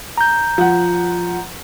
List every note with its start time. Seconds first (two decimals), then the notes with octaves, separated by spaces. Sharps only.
0.18 A#5 G6
0.58 F3 F#5